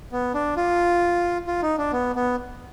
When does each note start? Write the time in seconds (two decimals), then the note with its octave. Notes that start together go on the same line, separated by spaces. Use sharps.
0.12 B3
0.34 D4
0.57 F4
1.47 F4
1.62 D#4
1.78 D4
1.92 B3
2.16 B3